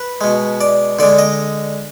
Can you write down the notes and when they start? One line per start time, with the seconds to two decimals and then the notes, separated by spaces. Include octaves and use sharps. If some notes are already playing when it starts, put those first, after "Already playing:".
Already playing: B4
0.21 B2 G#3
0.61 D5
0.99 D3 G#3 D5
1.19 D#5